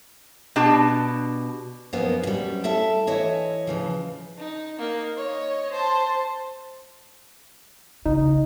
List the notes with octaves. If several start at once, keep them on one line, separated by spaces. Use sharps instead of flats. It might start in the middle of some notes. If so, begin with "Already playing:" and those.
B2 D4 G4 A5
F#2 F3 A#3 B3 D#4
F#2 G3
E4 A4 E5 A5
E3 E4 C#5 D#5
C#3 E3 F3
D#4
A#3 D#4
C#5 D#5
C5 A5
C#3 D#4